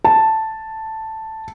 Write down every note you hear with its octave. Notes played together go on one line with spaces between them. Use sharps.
A5